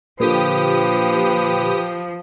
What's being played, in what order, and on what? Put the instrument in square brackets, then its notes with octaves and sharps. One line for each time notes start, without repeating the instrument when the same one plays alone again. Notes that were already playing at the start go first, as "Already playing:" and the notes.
[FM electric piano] A#2 D3 [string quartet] F3 [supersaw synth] G4 D#6 [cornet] B4